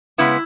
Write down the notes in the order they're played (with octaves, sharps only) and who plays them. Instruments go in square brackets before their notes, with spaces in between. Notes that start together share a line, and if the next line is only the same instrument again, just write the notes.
[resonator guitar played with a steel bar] C#3 G#3 B3 E4